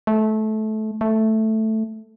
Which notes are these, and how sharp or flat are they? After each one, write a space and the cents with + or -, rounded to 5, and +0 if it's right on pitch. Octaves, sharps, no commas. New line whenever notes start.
A3 -20
A3 +0